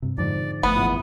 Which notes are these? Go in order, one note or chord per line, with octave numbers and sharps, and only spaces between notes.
G2 C3
F2 G#2 D3 F3 D5
G1 A3 B3 F#5 D#6
E2 A#2 E4